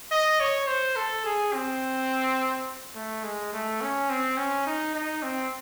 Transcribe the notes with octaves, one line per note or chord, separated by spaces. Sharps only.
D#5
C#5
C5
A4
G#4
C4
A3
G#3
A3
C#4
C4
C#4
D#4
D#4
C4